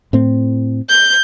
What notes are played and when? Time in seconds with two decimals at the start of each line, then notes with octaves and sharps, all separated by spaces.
0.13 A2 C4
0.89 G6